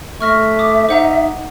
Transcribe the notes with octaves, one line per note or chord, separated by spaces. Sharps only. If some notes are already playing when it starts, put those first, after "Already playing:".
A3 E5 C#6 F6 A#6
D6 D#6
D#4 C5 F#5 A#5